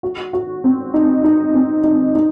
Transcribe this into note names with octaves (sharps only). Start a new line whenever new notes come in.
F#4
F#4
C4
D#4
D#4
C4
D#4
D#4